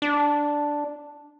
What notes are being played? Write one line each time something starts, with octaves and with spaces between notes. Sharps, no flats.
D4